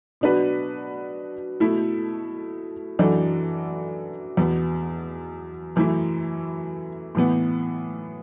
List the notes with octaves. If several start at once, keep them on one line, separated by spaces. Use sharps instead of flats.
B2 F#3 D4 F#4 B4
B2 A3 E4 A4
F#2 E3 D4 F#4 A4
E2 B2 B3
F#2 E3 A3 E4
A2 E3 B3